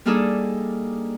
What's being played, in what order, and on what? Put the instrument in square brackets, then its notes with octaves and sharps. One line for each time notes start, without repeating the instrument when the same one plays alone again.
[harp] G3 A#3 D4 D#4 G#4 A4